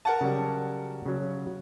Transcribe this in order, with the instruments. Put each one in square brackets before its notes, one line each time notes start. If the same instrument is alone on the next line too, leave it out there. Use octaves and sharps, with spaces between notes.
[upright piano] A#4 F#5 A5
[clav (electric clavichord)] C#3 F#3 G3
C#3 F#3